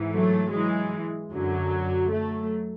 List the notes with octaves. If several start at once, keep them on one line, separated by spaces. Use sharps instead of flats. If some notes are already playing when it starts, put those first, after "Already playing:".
Already playing: G#2 E3
F#3 A3
E3 G#3
F#2 D3 F#3
F#3 A3